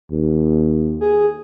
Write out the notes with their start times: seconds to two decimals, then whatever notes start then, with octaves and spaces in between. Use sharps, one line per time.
0.11 D#2
1.01 G#4